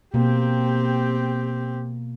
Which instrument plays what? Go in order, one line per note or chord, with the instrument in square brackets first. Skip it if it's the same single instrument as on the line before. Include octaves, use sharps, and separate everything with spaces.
[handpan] B2 [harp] A#3 [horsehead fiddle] C4 G4